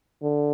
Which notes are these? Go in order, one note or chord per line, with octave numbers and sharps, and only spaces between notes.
D3